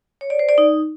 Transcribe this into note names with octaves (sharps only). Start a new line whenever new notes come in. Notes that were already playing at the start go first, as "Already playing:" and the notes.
C#5
D5
C5
D5
D#4